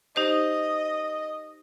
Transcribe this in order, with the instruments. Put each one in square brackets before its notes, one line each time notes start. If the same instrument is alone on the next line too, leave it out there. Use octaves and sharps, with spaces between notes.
[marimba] D#4 G4 C5 [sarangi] D#5